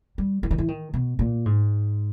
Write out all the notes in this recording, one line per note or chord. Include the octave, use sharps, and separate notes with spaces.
G3
E3
D#3
E3
D#3
B2
A#2
G#2